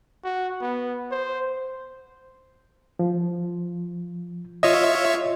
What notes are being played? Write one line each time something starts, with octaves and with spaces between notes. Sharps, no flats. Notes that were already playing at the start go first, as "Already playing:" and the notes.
F#4
B3
C5
F3
F4 C#5 D#5 E5 D#6